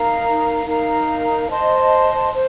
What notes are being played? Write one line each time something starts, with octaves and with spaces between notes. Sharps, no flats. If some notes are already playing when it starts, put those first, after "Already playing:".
Already playing: D#4 A#4 F5 A#5
D#4 A#4 F5 A#5
C5 D#5 A5 C6
C5